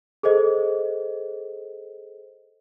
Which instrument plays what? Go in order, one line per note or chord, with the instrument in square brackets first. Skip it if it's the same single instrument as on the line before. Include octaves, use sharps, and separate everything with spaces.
[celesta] G#4 A4 C5 D#5